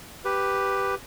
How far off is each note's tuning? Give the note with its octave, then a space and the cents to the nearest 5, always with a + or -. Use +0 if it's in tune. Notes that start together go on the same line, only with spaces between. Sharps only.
G4 +0 B4 +0